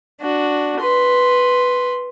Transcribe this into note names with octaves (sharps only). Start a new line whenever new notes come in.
D4 F#4
B4 C6